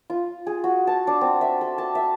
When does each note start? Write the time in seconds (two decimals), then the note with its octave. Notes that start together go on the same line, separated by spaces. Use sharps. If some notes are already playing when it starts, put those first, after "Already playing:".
0.10 F4
0.47 G#4
0.64 F#4
0.87 A5
1.07 D4
1.21 C4
1.41 E5
1.61 A4
1.78 A5
1.95 E5